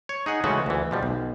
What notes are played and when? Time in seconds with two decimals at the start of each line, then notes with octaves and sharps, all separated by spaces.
0.09 C#5
0.26 D#4 G#4 F#5 G#5
0.44 C#3 E3 G#3 A3 C#4 F#4
0.66 D2 E3
0.91 B2 F3 G3
1.03 B1